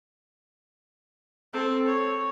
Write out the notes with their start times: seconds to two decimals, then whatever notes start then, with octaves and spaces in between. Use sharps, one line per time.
1.53 C4 A4
1.87 C#5